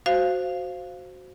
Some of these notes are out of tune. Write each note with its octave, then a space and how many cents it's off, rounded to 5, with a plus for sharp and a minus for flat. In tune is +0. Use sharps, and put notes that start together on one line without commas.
F#4 +0 C5 +0 F5 -5